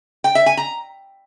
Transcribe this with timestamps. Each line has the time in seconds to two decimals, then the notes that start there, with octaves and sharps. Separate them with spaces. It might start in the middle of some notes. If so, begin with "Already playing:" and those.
0.24 G5
0.35 E5
0.46 G#5
0.57 A#5